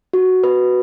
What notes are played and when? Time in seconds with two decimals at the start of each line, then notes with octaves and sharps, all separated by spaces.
0.13 F#4
0.43 B4